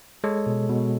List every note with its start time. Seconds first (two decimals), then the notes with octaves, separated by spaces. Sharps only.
0.24 G#3 A4 C#5
0.46 B2
0.69 B2